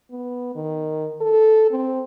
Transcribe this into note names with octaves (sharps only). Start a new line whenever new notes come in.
B3
D#3
A4
C4